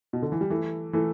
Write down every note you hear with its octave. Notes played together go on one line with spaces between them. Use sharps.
B2
D3
E3
G3
E3 A3
E3 A3